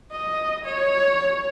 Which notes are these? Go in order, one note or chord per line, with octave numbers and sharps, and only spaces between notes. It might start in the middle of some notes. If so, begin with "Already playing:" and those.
D#5
C#5